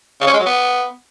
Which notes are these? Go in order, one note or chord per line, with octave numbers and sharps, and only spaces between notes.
C#3
C#4
G#3
F#3
B3